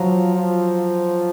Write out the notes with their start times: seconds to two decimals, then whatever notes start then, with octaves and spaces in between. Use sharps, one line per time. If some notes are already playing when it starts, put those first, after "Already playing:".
Already playing: F3 F#3
0.36 F3